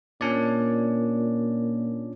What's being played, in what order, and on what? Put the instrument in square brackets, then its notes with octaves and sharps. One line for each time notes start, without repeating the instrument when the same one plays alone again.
[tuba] A#2 [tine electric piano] C#4 D4 D5